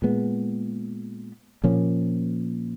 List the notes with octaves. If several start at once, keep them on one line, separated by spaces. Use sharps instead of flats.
A#2 G#3 B3
A#2 F3 A#3 C#4